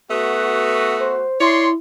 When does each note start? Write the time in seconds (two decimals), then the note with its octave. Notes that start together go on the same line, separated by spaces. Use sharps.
0.11 A3 B3 F#4
1.00 C5
1.40 E4 C#5 D5 C6